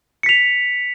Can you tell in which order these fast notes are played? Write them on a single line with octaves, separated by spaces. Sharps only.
C#7 B6 F7